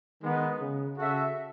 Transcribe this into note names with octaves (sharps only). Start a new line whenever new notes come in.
D#3 G#3 B3 D#4
C#3
C#3 F#4 A4 E5